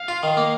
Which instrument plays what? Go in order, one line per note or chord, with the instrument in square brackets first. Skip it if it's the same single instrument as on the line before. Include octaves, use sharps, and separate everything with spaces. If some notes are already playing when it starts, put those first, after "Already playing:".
Already playing: [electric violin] F5
[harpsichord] F4
D#3
A#3